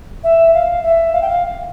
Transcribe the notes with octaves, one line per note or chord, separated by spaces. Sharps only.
E5
F5
E5
F5
G5
F5